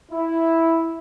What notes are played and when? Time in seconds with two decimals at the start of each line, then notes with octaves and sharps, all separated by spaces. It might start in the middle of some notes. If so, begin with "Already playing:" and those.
0.12 E4